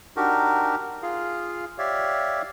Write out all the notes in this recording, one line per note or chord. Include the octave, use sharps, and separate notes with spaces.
D4 D#4 F#4 G4 A#4
F4 G#4 F5
G4 C#5 D5 E5 F5